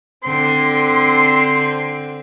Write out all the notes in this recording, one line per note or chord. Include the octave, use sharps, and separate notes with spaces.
D3 C4 C6